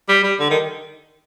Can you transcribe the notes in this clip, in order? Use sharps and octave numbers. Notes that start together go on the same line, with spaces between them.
G3
G3
D3
D#3